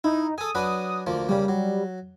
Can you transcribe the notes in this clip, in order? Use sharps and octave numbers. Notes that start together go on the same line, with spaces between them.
D#4 E4
G#4 A4 D#6
F#3 D4 B4
D2 F3 A#3
C#3 G3 A#3
F#3